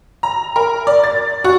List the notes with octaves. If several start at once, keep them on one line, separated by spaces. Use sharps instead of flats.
A#5
A#4
D5
A6
F#4